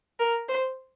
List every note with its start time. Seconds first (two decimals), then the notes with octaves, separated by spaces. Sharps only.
0.19 A#4
0.49 C5